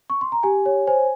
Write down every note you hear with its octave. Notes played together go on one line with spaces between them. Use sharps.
C#6
C6
A#5
G4 G#5
C#5
C5 G#5